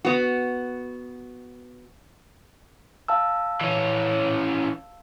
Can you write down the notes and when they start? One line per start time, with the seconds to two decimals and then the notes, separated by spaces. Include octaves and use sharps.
0.05 B3 F#4
3.08 F5 A5 E6
3.61 E3 C#4